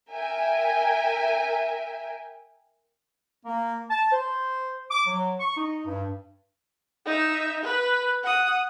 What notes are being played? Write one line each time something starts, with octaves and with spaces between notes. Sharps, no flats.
A#4 E5 G5 G#5
A#3
A5
C5
D6
F#3
C#6
D#4
G2
D#4 E5
B4
F#5 D#6